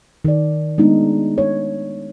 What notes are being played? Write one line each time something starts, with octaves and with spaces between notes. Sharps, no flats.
D#3 D5
G#3 A3 B3 D4 D#4
C#5